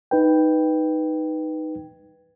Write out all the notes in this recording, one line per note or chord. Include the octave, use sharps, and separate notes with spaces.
D#4 B4 G5